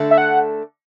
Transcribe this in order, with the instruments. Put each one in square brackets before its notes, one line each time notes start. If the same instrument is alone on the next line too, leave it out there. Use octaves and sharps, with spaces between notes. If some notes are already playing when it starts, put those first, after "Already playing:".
Already playing: [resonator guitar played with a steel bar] D3 A3 D4 A4
[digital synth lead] E5
F#5